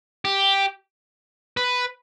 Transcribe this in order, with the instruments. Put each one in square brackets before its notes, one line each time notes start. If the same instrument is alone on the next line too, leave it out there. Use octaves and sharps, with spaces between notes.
[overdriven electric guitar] G4
B4